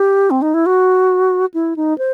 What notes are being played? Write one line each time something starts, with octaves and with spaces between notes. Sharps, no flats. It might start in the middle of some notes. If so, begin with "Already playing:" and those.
Already playing: G4
C4
D#4
E4
F#4
E4
D#4
C5